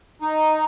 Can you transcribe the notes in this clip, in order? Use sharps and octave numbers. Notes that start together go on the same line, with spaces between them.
D#4